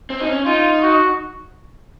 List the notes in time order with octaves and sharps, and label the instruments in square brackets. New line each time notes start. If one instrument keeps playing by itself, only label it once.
[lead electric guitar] C4
D#4
C#4
[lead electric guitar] D#4 [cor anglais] F4
[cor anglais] F#4